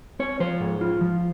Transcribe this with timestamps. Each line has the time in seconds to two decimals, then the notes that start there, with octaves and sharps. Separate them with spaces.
0.19 C4 C#5
0.40 F3 C5
0.60 G#2
0.81 F4
1.01 F3